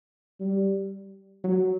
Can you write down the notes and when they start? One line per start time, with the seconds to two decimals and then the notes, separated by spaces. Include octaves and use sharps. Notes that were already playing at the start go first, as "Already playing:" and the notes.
0.40 G3
1.44 F#3